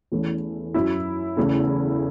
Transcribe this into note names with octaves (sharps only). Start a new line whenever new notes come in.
E2 E3 A3 C#4
F#2 F#3 C#4 E4
E2 C#3 A3 E4